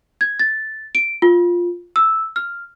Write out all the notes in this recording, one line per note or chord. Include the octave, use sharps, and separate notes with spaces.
G#6
A6
D7
F4
E6
F6